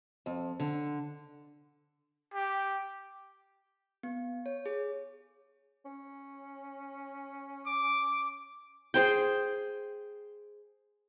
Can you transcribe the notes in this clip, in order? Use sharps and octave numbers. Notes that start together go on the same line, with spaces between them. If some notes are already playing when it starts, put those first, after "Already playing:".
F2
D3
G4
B3
C#5
G#4
C#4
D6
G#4 C5 G5